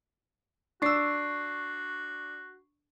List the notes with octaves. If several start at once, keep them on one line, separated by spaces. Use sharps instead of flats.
D4 F#4 C#6 E6 C7